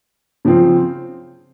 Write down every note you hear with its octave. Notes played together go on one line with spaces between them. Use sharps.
C#3 F3 C4 F4